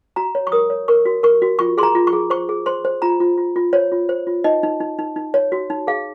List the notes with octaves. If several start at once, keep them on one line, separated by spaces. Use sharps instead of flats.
F#4 A#5
C#5
C#6
A#4 D#6
C#5
A#4 C#6
F#4
A#4 C#6
F#4
F4 C#6
G#4 C6
A#5
F4
C#6
G#4
C5 C#6
G#4
C5 C6
C5
F4 A#5
F4
F4
F4
C5 C#5
F4
C5
F4
D#4 D#5
D#4
D#4
D#4
D#4
C#5
F#4
D#4
G#4 F5